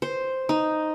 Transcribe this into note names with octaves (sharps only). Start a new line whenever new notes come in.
C5
D#4